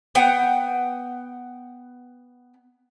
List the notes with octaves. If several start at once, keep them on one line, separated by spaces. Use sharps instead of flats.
B3 F#5 G5